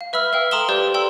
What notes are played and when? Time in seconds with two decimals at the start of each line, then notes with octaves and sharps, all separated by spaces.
0.01 F5
0.13 B4 E5 B5 E6 F6
0.33 B4 F5 G5
0.51 A4 A#5 C6 D#6 E7 G7
0.69 G4 B4 C5 D5 G6
0.94 A4 G5 A#5 C6 E6